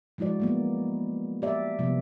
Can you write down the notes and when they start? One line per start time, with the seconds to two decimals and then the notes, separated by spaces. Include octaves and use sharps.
0.18 F3 G#3 E4 F#4 D5
0.40 F#3 A#3 B3
1.42 G4 D5 E5
1.79 C3 F3 G3 B3